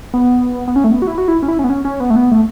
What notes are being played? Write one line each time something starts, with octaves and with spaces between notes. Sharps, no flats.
B3
B3
C#4
A3
B3
F#4
E4
F#4
E4
C#4
E4
C#4
B3
C#4
C#4
B3
A3
B3
A3